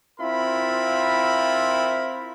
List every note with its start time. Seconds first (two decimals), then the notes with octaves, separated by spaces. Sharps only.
0.19 C4 E4 F4 A#4 B5